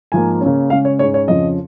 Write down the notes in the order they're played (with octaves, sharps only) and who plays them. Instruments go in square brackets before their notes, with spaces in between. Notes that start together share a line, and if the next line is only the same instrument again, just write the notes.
[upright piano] G#2 F3 A#3 G#5
C#3 A#3 C#4
C#3 G#3 C#4 F5
C#5
G#2 G#3 C#4 C#5
C#5
F2 C#3 F3 C#4 D#5